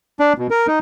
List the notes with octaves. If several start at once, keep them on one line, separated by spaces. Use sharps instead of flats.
D4
B2
A#4
D#4